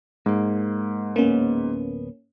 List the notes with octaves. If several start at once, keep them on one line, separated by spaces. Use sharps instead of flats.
G#2 G#3 A#3
D1 D#2 A#3 B3 C#4